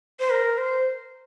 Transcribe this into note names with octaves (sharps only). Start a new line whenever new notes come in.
C5
A#4
C5